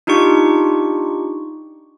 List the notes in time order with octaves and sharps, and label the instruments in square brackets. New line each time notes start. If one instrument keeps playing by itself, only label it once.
[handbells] D4 D#4 F4 G4 C#6